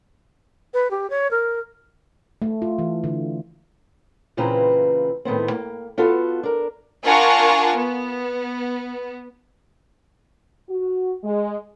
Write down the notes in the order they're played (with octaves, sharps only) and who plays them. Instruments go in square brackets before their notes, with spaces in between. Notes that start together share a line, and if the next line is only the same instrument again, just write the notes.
[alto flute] B4
G4
C#5
A#4
[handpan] A3
F4
E3
D3
[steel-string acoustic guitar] A#2 C#3 E3 C4 B4 A#5
A2 D#3 B3 C4
A#3
B3 F4 F#4 A4
D4 A#4
[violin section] D4 F4 A#4 F#5 G#5 C#6
B3
[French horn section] F#4
G#3